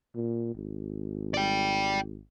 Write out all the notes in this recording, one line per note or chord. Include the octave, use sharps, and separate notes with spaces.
A#2
G#1
D5 G5